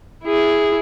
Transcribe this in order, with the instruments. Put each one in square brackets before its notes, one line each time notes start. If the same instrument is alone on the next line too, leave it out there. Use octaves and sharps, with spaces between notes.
[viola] E4 G#4